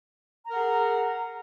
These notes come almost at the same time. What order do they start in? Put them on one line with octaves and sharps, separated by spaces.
A#5 A#4 F#5 G#4